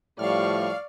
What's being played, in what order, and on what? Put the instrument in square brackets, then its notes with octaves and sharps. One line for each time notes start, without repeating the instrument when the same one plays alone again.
[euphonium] A2 [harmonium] F3 G3 [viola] D5 C#6 [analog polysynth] F5 F6